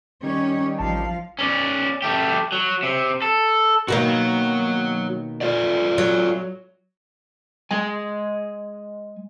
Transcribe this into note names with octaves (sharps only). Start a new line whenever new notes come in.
D#3 G3 C#4 C#5
A1 F3 F5 A5
C#4 D5
A3 G4
F#3
C3
A4
B2 D#3 A#3 F#4 C#5
F4 A4 D5
F#3
G#3 G#5